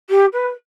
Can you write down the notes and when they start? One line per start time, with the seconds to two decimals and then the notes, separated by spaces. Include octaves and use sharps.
0.10 G4
0.33 B4